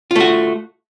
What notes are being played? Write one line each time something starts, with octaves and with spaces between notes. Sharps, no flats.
A3 F4 F#4